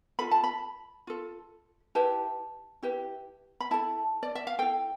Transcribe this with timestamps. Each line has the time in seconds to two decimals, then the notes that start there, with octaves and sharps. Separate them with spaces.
0.19 F4 A4 B5
0.31 A5
0.44 B5
1.07 F4 A4
1.95 E4 G4 B4 A5
2.82 E4 G4 B4
3.61 B5
3.71 E4 A4 A5
4.23 D5
4.35 E5
4.47 F5
4.59 E4 A4 G5